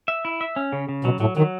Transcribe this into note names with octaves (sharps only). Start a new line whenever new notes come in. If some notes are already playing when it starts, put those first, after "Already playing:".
E5
E4
E5
C#4
C#3
C#3
B2 F#3
A2 F#3
D#3 F#3